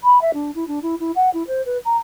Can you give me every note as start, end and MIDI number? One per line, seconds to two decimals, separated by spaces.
0.04 0.21 83
0.22 0.31 76
0.34 0.51 62
0.55 0.67 64
0.68 0.79 62
0.82 0.95 64
1.00 1.12 64
1.16 1.30 78
1.34 1.43 64
1.48 1.64 72
1.66 1.78 71
1.85 1.97 82